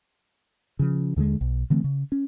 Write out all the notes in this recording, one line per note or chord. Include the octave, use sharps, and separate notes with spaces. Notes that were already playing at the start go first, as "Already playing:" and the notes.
C#3 F3
D#2 D3 D#3 G#3
B1
D3 E3 A3 C4
C#3
C#4